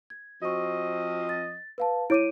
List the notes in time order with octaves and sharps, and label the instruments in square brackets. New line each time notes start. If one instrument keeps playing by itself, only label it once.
[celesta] G#6
[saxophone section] F3 C4 D#5 [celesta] F#4 C#6
[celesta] A6
B4 F5 A5
[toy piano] E4 C#5 D6 [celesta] D7 D#7